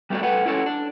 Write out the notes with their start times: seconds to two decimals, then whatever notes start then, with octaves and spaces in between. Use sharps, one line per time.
0.10 G3 A3 B3 E4 F#4 D5
0.23 A3 A4 B4 F#5
0.45 C#4 E4 F#4 A4 B4 C#5
0.66 D4